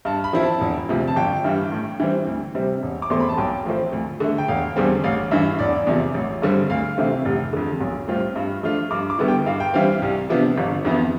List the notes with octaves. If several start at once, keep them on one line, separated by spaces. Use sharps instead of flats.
G2 A5
B5
F3 C4 E4
A5
E1
D2 C3 F3
A5
G1 G5
G2 E3 G3
A2
E3 G3 C4
D2
C3 G3 C4
E1
D6
E2 B2 A3 C4 C6
B5
A5
B1 G5
A2 F3 A3 C4
D2
D3 A3
G5
E1 F5
E2 D3 G3 C4
A1 F5
G2 E3 E5
E1 D5
E2 C3 F3
A1
G2 D3 G3 C4
D2 F5
C3 E3 A3 C4
F1
F2 D3
B1
A2 G3 C4 F4
G2
F3 A3 D4 F4
G2 D6
D6
D3 G3 B3 E4
G5
G2 F5
G5
E3 G3 C4 F5
C2
C3 F3 B3 D4
G1
F2 E3 B3